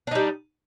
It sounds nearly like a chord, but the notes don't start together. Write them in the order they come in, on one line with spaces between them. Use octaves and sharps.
D4 D#4 G3